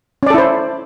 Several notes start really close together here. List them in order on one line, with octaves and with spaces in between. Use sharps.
C#4 D5 A4 E4 C5